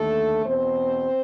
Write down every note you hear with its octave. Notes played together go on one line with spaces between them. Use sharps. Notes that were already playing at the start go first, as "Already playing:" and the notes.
Already playing: D#2 D3 A3 A4
E2 B2 C4 C5